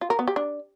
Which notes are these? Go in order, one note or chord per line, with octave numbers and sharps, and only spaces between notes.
F4
A#4
B3
G4
D4